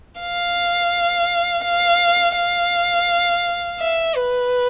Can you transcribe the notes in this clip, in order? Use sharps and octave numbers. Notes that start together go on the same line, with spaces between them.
F5
F5
F5
E5
B4